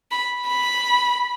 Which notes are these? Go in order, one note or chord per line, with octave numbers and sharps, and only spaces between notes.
B5
B5